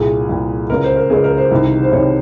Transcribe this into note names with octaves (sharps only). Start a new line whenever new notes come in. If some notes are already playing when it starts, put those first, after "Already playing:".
Already playing: C2 A#2 G#4
C2 A#2
C#2 C#3 A#4
C5
A#4
C#2 C#3 G#4
A#4
C5
C2 C3 D#3
C5
C2 C3 D#3 C#5